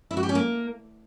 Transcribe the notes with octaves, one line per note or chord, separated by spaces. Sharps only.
E4
F#4
G4
C#4
A#3